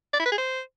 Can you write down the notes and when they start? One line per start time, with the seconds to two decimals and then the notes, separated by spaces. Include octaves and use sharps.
0.13 D5
0.20 E4
0.26 B4
0.32 G#4
0.38 C5